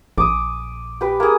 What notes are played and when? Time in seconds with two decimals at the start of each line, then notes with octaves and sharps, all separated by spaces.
0.17 A#1 D6 D#6
1.01 G4 B4
1.20 A#3 G#4